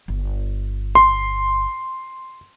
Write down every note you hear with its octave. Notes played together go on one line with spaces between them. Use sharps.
G1
C6